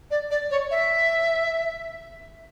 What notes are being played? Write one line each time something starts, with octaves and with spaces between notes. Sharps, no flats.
D5
D5
C#5
E5